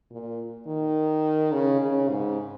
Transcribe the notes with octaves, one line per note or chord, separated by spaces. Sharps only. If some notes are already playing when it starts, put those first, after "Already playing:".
A#2
D#3
C#3
C#3
G#2